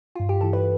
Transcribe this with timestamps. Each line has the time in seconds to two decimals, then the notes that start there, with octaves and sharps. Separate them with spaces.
0.15 G2 F4
0.29 G4
0.41 E3 A4
0.53 B4